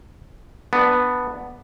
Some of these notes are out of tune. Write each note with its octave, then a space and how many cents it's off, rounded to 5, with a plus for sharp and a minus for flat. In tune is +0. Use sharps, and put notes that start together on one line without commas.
B3 +0 D4 +10